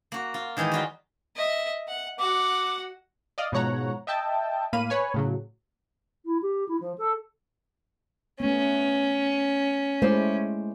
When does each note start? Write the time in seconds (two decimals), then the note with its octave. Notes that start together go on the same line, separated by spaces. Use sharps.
0.12 A#3 F#4
0.34 F4
0.57 D#3 E3 G#3 D#4 G4
0.71 G3 F4 F#4
1.36 D#5 E5
1.88 F#5
2.19 F#4 F#5 D6
3.38 D5 D#5 F5
3.52 G#2 B2 F3 C#5 F#5 A#5
4.07 D#5 E5 G5 A5
4.73 A2 A#3 F5 B5 D#7
4.90 B4 C#5 G#5
5.14 A2 C#3 F#3
6.25 E4
6.42 G4
6.68 E4
6.80 F3
6.98 A4
8.40 A3 B3 C#4
10.02 G#3 A3 E4 C5 D5